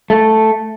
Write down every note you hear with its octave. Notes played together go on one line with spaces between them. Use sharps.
A3